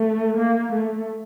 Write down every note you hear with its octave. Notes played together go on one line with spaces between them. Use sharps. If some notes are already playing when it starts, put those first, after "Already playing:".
Already playing: A3
A#3
A3